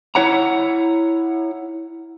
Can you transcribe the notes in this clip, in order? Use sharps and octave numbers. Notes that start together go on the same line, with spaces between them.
E4 C#5 F#5 A#5